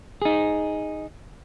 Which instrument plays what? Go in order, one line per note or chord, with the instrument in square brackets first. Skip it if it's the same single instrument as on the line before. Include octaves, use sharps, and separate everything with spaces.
[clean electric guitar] D#4 G#4